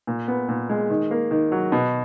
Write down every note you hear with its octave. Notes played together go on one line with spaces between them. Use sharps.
A#2
B3
A#2
G#3
D#3
A#3
D#3
F#3
B2